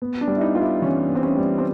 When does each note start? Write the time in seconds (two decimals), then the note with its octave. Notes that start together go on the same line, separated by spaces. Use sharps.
0.02 B3
0.21 D4
0.28 G3
0.36 E4
0.41 D#4
0.55 B3 F4
0.62 E4
0.82 E3 C#4
1.09 B3
1.15 C4
1.23 C#4
1.36 G3
1.58 C4